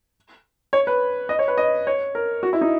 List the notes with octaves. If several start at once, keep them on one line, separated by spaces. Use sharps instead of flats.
C#5
B4
D#5
C#5
B4
D#5
C#5
A#4
F#4
E4
D#4